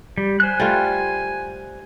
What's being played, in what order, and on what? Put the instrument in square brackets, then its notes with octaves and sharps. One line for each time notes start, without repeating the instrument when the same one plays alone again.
[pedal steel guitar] G3
[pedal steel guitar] C5 F#6 [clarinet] G#5
[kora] G3 A3 F4